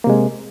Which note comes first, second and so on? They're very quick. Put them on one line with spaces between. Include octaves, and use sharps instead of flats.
A#3 C3 G#3